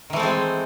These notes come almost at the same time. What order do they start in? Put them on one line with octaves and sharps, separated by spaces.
D#3 E3 A3 C4 G#3